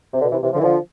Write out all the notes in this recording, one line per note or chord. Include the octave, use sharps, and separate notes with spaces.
C3
B2 D3
C3 E3
C3 E3
D3 F3
E3
D3 F3